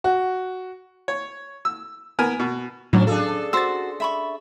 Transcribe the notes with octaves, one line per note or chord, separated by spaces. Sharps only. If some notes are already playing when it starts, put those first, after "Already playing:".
F#4
C#5
E6
B3 A#4 G#5
B2
A2 F3 F#3 C#4 D4
D4 G#4 A4 F5
F#4 C5 E6 A6
E5 B5 C#6